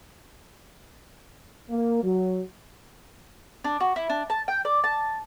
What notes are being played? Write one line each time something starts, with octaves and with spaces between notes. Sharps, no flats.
A#3
F#3
D4
F#4
E4
D4
A5
G5
D5
A5